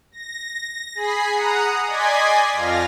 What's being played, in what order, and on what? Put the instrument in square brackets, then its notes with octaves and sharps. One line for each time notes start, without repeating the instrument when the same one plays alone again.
[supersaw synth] A#6
G#4 B5 C7
F#5 A#5 D#6
D5 D#5 G#5 C6 G#6 B6
F2 F4 F5 A#6